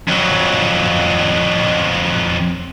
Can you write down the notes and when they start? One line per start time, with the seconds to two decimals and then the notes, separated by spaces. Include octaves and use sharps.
0.08 F2 F#3